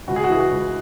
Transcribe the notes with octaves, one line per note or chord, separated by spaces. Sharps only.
C#2 F#4
G#4
F#4
E3 G#4
F#4
C#2